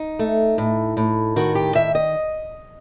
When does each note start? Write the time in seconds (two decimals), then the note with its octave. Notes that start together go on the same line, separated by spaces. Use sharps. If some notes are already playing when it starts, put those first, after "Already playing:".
Already playing: D#4
0.19 A3
0.58 A2
0.97 A2
1.36 D#3 F#4
1.55 G4
1.75 D#3 E5
1.95 D#5